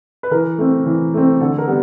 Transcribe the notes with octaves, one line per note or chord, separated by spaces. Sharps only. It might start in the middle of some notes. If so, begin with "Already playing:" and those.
B4
E3 A#4
A3 C4
E3
A3 C4
D3 A4
A#4
G3 B3